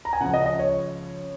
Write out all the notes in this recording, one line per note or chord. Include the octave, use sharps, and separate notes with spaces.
A#5
G#5
C#2 C#3 F3 F#5
D#5
D#5
C#5